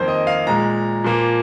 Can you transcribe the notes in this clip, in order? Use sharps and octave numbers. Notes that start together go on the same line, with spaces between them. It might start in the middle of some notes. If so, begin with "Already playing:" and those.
Already playing: F2 D#3 A#3 C5
D#5
F5
A#2 G#3 A#5
A#2 F3 A#3